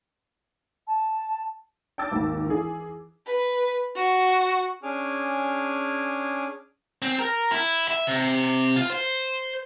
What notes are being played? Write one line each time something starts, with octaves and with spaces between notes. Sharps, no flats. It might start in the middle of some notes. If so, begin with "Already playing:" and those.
A5
G5 A5 D6 E6 A6
G#1 D#2
E3 G#4
B4
F#4
C#4 D4 G#4 G#5 D6 F6
C4
A#4
E4
E5
C3
F4
C5